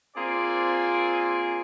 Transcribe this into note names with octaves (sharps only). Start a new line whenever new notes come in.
A#3 C4 F4 G#4 D5